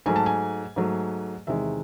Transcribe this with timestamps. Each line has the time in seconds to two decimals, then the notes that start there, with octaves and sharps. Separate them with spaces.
0.06 G#2 F#3 A3 G#5
0.16 A5
0.26 G#5
0.76 G#2 F#3 A3
1.47 E2 C3 D#3 G#3 E5